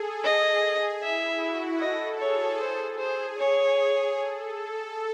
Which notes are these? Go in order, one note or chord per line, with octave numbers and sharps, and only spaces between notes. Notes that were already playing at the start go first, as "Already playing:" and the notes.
Already playing: G#4 A4
G#4 D#5
E4 E5
F#4
A4 D#5
G#4 C#5
C5
G#4 C5
G#4 C#5
G#4
A4